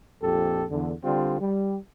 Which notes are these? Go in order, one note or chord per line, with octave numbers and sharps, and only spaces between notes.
A#1 F2 G4 A4
E2 D3
D3 G3 C4 F4
G3